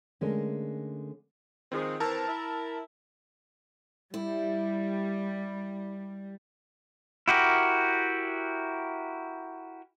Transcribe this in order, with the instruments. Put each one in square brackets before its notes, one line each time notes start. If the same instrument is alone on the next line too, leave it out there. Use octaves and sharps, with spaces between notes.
[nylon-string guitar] D3 G#3 A3 C#4 A#4
[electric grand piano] D#3 C4 [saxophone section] F3 G#3
[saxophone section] E3 C4 [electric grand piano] A#4 A5 E6
[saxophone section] E4
[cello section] G3 [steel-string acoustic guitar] E4
[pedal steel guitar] E4 F#4 G4 A#4